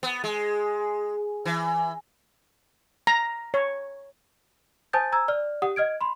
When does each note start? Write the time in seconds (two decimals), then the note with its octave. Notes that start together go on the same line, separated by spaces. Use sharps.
0.03 B3
0.24 G#3
1.45 E3
3.07 A#5
3.54 C#5
4.93 C5 G#5 A5 D#6 G6 A6
5.12 G#5 A#5 E6 G#6
5.28 D5 F6
5.62 G4 F#5 D#6
5.76 D#5 F6 G#6 D7
6.01 B5 C6